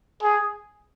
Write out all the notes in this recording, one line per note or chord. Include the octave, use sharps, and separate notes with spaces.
G#4